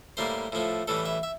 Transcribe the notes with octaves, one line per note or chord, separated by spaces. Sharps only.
A2 G3 A#3 C5
A2 F3 A3
A2 E3 G3 A4
E5
E5